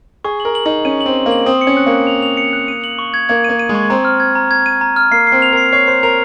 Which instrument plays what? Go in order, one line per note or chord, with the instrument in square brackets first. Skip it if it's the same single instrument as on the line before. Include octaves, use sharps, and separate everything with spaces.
[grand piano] G#4 [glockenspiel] C#6
[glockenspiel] F#7
[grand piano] A#4
[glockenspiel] F#7
[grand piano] D#4 [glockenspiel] F#7
[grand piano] C#4 [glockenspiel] D#7
[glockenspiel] F#7
[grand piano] C4
[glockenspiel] D#7
[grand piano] A#3
[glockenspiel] F#7
[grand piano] C4 [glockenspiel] D#6
[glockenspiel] C#7
[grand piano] C#4
[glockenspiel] F#6
[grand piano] A#3
[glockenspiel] F#6
F7
F7
C#7
F#6
D#7
F#7
C#6
G#6
[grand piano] A#3 [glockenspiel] G#6
[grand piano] A#3 [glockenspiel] D#7
[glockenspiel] D#7
[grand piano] G#3
[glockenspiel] C#6
[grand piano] C4 [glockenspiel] A#5
[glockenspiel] F6
G#6
A#5
G#6
D#7
A#5
F6
[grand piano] A#3 [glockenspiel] C7
[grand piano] C4 [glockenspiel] C7
[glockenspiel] F7
[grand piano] A#4 [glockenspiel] C7
[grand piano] C#5 [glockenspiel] C7
[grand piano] C5 [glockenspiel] C7
[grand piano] A#4 [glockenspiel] F7